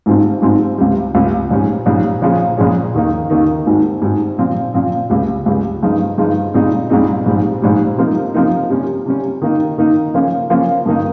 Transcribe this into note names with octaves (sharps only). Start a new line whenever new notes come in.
G#1 G#2 G3 C4 F4
G#1 G#2 G3 C4 F4
C#2 C3 G3
C#2 C3 G3
A#1 G#2 G3 C#4
A#1 G#2 G3 C#4
A#1 A#2 F3 G#3 C#4
A#1 A#2 F3 G#3 C#4
D#2 D#3 A#3 D#4
D#2 D#3 A#3 D#4
G#1 G#2 G3
G#1 G#2 G3
A#2 F3 C4
A#2 F3 C4
C#2 C#3 G3
C#2 C#3 G3
G2 F3 G#3 D#4
G2 F3 G#3 D#4
C2 A#2 G#3 C4 D#4
C2 A#2 G#3 C4 D#4
A#1 G#2 G3
A#1 G#2 G3
C3 F3 A#3 D#4
C3 F3 A#3 D#4
C3 G3 C#4
C3 G3 C#4
D#3 A#3 D#4
D#3 A#3 D#4
C#3 F3 A#3 C#4
C#3 F3 A#3 C#4
G2 D#3 A#3 D#4